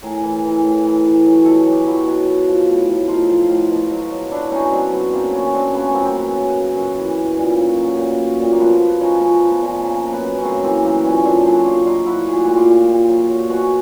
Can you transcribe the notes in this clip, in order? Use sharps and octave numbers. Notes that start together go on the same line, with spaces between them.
A2 G#4 A#4
E3
E3
A2
E3
E3
F#3
B2 A4
G#4
F#3
G4
F#3 E4 F#4
B2
B2
F3
A2
A2
F3 D#4 F4
F3
A2
B2
F#3
F#3
F#3 D4 E4
B2 C#4 D#4
F#3 C4 D4
F#3 B3
F#2 A#3 C4
F#3 B3 C#4
F#3 C4 D4
C#3 B3 C#4
F#3 A#3 C4
C4
C#3 B3
F#2
C#3
F#2
E3
F#2
A#2
F#3
F#3
A#2
F#3
A#2
A#3
F3 B3
F3 B3
F3 C#4 D#4
F3 B3 C#4
F3
B3
A#2
C#3 A#3
F#2
B3
F#2
C#4
C#3 A#3 C4
E3 A#3 C4
F#2 A#3 C4
A#2 B3 C#4
A#2 C4 D4
F#3 F#4 G#4
F#3 F4 G4
F#3 D#4 F4
F#3 E4 F#4
A#2 G#4
G4
A#2 F#4
F4 G4
A#2
A#2
F#3
F#3
B2 F#4 G#4